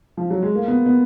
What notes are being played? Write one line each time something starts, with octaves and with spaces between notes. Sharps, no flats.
F3
F#3
G#3
A#3
B3
B3